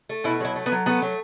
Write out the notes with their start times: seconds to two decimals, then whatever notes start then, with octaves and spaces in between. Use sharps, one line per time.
0.09 A3
0.24 B2 E4
0.40 F#3 E4
0.55 A3
0.66 B3
0.72 F#3
0.86 A3 B3
1.02 F#3